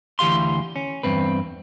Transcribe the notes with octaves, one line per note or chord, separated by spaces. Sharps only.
D2 E3 G4 F5 C6
C#4
E2 G2 C4 B4